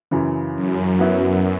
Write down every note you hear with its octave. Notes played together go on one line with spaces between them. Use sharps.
F#2 C#3 E3
F#2
F#3 B3 E4